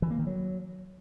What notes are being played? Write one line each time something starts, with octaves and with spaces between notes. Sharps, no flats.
E3
A#3
D#3
F#3